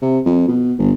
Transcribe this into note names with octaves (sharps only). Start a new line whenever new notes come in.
C3
F2
B2
G1